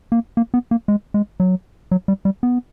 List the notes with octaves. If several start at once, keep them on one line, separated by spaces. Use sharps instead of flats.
A#3
A#3
B3
A#3
G#3
G#3
F#3
F#3
G3
G3
B3